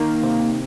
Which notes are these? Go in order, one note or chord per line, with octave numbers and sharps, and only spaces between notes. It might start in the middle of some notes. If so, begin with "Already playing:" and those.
Already playing: D#3 A#3
C3